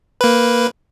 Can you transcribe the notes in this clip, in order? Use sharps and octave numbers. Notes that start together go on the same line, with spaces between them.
A#3 B4